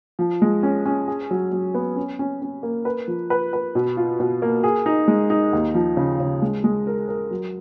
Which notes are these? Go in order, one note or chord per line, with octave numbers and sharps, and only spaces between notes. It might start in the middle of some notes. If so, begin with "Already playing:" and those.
F3
G#3
C#4
C#4
G#4
F#3
F#3
B3
C#4
C#4
C#4
A#3
B4
F3
B4
B4
B2
F4
B2
A#3
G#4
D#4
G#3
D#4
D#2
F3
C#3
C#3
G#3
G#3
A#4
A#4
F#3